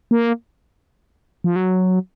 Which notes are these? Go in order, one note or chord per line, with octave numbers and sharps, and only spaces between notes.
A#3
F3
F#3